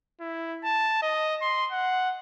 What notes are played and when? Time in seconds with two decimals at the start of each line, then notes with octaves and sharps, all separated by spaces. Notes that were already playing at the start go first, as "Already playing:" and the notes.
0.20 E4
0.63 A5
1.02 D#5
1.42 C6
1.71 F#5